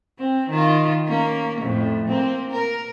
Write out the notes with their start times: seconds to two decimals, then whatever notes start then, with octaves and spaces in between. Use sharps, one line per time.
0.19 C4
0.50 D#3 F4
1.08 A#3 C#4
1.61 F2 A2
2.08 A#3 C4
2.51 A#4